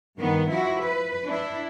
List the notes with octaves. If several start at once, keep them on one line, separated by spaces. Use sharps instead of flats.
G2 D#3 B3
F3 E4 F#4
B4
D4 E4